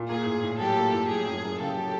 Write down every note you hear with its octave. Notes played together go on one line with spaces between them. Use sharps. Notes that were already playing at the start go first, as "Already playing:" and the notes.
Already playing: A#2
A#3 G#4
A2
A2
F#3 G4 A4
A#3
A2
F#3 G#4
F#2
F#2
C#3 G4 A4
F#3